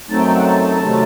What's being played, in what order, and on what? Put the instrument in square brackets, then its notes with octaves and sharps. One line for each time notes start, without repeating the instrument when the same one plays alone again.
[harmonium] F#2 F#3 A3 C4 D#4 A5
G5
A5
F#5
A5
C3 D#3 F#3 A3